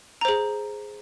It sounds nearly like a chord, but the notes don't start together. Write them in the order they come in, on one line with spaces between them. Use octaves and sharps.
A#5 C5 G#4